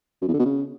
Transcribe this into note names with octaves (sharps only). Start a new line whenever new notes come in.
F#2
E2
D3
B2
C#3